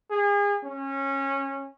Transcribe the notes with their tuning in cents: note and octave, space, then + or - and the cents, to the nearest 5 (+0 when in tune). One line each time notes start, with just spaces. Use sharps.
G#4 -35
C#4 -20